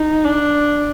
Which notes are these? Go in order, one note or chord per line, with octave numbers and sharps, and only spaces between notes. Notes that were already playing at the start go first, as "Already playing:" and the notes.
Already playing: D#4
D4